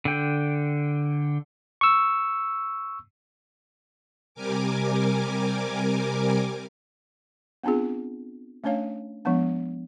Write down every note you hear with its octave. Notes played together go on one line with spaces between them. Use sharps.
D3 G5
C#6 E6
C3 G3 A#4 G#5 D6
B3 C4 D4 F4 G#4
A3 C#4 D4 C#5 F5
F3 G#3 B3 D4